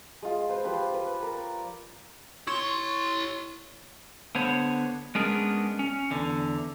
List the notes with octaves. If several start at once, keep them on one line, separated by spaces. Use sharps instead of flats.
G#3 F4
B4 C5 B5
F3 G4 B4
B4
A#4 D5
E4 C#5 C6
D3 B3 C5 C#5
G#3 B3 C#4 D4 G#4 A#4
C#4
E2 D3